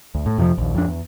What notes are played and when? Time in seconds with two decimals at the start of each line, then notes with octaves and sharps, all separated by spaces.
0.15 D2
0.26 A2
0.38 F2 C3 E3 F3
0.58 A#1 D#2
0.75 F2 D4
0.88 E2